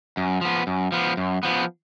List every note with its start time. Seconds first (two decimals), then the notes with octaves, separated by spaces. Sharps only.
0.17 F#2
0.41 F3 B3
0.67 F#2
0.92 F3 B3
1.17 F#2
1.43 F3 B3